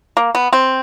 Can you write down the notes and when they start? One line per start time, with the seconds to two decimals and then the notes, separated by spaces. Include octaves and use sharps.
0.17 A#3
0.35 B3
0.53 C4